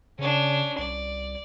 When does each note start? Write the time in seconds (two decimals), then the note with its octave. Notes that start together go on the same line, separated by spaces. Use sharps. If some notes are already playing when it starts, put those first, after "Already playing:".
0.19 C#3 C#4 D4
0.78 C2 D5